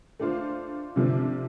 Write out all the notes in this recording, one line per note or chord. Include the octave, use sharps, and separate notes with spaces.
A3 D4 F4 C5
C3 F3 A3 D4